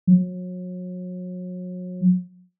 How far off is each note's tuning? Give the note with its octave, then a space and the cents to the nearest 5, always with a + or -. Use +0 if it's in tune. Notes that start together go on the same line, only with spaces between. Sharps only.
F#3 -35